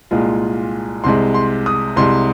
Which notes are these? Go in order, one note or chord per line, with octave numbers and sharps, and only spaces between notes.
C2 A#2 G#3 F4
C2 C3 G#3 C6
C6
D#6
C2 C3 G#3 C6